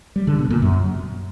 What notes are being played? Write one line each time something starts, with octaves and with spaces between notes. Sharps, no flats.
G3
D3
B2
A#2
F#2